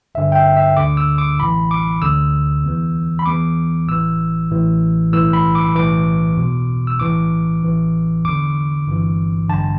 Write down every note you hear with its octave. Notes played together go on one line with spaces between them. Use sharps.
G1 G2 D3 E5
G5
E5
E5
D2 D3 D6
E6
D6
A1 A2 E3 B5
D6
D2 D3 E6
E2 E3
B5
E2 E3 D6
A1 A2 E3 E6
A1 A2 E3
B1 A2 E3 E6
B5
D6
B1 A2 E3 D6
E2 B2
E6
B1 A2 E3 D6
A1 A2 E3
E2 D3 D6
G1 G2 E3
A1 G2 D3 A5